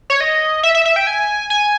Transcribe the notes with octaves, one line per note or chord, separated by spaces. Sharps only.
C#5
D#5
E5
E5
E5
G5
G#5
G#5